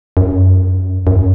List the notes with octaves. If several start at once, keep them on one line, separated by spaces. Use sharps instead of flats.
F#2
F#2